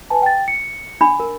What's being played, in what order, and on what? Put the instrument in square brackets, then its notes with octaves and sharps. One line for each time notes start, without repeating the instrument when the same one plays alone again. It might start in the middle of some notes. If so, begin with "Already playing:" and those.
[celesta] B4 G#5 A5
G5 A6
C#7
[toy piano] D4 B5
A#4